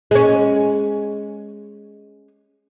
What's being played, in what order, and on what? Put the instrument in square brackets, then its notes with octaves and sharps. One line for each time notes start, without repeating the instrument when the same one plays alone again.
[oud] G#3 C#4